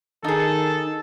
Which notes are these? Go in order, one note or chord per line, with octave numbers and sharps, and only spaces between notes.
D#3 D#4 G#4 A4